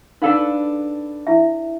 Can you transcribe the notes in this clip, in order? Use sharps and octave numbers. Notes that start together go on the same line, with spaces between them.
D4 D#4 A4 B4 F5
E4 E5